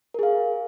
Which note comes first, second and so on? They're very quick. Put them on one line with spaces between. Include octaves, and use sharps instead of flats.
A#4 G#4 F5